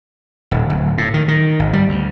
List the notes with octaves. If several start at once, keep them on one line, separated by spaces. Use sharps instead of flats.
D#1
D1
A2
D#3
D#3
G#1
G3
D2